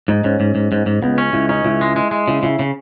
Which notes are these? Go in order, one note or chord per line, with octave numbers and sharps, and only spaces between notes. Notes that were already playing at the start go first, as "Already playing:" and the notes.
G#2 D#4
G#2 C#4
G#2
G#2
G#2
G#2
C#2 B3
C#4
C#2 E4
C#4 D#4
C#2 E4
G#3
G#3
G#3
C#3 E4
C#3 E4
C#3